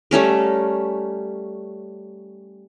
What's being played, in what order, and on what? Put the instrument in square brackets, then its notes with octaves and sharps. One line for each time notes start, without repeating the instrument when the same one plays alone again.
[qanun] G3 A3 C#4 A#4